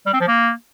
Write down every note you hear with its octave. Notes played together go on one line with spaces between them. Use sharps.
G3
C4
F3
A#3